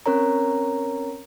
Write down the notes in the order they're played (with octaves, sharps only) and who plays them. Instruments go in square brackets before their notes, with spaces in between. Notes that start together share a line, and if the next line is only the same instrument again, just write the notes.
[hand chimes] C4 C#4 A#4 C#5 A#5